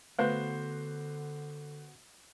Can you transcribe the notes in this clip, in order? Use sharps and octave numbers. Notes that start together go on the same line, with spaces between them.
D3 A3 B3 F#4 B4 C5